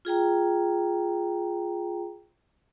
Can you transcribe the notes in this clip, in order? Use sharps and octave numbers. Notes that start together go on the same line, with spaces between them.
F4 G#4 G5 A#5